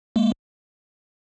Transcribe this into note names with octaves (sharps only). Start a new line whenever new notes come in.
G#3 A#3